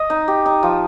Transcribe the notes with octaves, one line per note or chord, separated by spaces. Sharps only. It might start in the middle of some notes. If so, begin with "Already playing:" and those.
Already playing: D#5
D#4
G4
D#4
F3